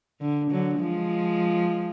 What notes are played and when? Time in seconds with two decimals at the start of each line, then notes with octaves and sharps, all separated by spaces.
0.21 D3
0.50 D3 F#3
0.80 F3 G#3